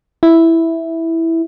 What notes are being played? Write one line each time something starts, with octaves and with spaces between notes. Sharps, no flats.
E4